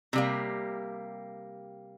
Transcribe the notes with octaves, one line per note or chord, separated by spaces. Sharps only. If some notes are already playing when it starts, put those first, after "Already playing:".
C3 G3 A#3